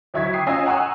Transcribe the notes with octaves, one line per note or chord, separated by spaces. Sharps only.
D2 F#3 E4 C#6 G#6 B6
G5 D#6 C7
C#4 F4 D#5 G#5 E6
F#5 G#5 A#5 C#6 D#6 E6